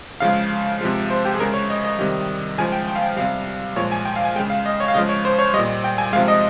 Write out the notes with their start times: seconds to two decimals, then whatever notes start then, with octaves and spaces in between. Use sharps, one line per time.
0.20 C#3 F3 G#3 F5
0.81 C3 F3 G#3
1.10 C5
1.25 G4
1.35 G#4
1.39 C#3 G#3 A#4
1.54 C#5
1.70 D#5
1.85 D#5
1.99 C3 D#3 G3
2.58 C#3 F3 G#3 G#5
2.72 G5
2.88 G5
2.96 F5
3.02 G5
3.17 C3 G3 F5
3.76 A#2 F3 G#3 C#5
3.92 G#5
4.05 G5
4.16 F5
4.25 G#5
4.35 G#3 G5
4.40 C#3
4.50 F5
4.66 D#5
4.80 C#5
4.88 F5
4.94 C#3 F3 G#3 D#5
5.09 C#5
5.25 C5
5.39 C#5
5.54 G3 D#5
5.58 A#2
5.84 G5
5.98 G#5
6.13 G#3 F5
6.16 C3 F3
6.28 D#5